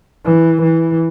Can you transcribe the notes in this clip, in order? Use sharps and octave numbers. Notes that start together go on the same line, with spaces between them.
E3
E3